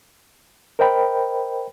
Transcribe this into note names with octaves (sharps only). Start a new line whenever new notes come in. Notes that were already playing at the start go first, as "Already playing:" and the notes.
A#4 C5 D#5 G5 B5